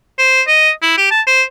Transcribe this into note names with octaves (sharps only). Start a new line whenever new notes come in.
C5
D#5
E4
G4
A5
C5